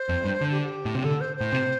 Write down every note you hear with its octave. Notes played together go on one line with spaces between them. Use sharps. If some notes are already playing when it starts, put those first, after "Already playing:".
Already playing: C5
F2
G2
D3
G4
G4
A2
C3
D3 A4
C5
A2 C5
C3